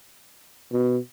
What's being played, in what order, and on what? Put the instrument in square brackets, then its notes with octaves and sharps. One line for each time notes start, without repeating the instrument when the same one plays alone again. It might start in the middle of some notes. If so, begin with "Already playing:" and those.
[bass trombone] B2